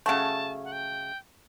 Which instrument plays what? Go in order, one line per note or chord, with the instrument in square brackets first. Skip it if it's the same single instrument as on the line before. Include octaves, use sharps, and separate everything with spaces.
[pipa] C#3 F#3 A3 [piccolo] A5
[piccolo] F#5
G5